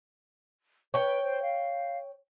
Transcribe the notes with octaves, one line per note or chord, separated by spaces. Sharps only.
B4 C#5 G5
C5
F5